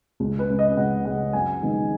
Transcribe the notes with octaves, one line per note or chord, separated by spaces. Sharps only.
C#2
B4
C#3 G#3 C#4
D#5
C#2 F#5
C#3 G#3 C#4 F#5
F#2 G#5
D#3 G#3 B3 D#4